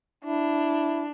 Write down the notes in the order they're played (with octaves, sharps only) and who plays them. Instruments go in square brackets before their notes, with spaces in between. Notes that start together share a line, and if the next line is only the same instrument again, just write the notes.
[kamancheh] D4 [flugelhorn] E4